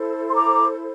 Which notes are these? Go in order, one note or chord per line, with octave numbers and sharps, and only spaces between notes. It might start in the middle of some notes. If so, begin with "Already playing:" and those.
Already playing: E4 A4 C5
C6
A#5 D6